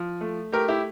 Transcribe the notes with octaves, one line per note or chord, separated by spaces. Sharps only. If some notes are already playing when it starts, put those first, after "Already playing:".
Already playing: F3
A3
A3 G4 A#4
E4 G4